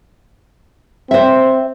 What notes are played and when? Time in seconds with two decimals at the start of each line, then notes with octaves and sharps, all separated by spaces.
1.11 C4 C5 E5